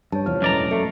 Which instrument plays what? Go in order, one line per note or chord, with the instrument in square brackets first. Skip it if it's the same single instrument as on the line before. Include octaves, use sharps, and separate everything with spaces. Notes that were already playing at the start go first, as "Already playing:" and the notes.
[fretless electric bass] G2 [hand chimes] C#5 A5
[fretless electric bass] F1 E2 F3 [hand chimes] F6
[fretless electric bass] E1 A2 [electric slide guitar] F#2 D5 A#5 [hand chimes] B4 D#5
[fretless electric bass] A3 [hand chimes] C7 C#7